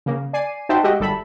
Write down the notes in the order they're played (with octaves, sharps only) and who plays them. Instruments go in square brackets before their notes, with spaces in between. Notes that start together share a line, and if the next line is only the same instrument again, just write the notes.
[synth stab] C#3 A#3
D5 G#5 C7 D#7
D#4 F#4 C5 E5 G5 A5
G#3 F#4 G4 D#5 E5 G5
G1 G3 A4 E5 B5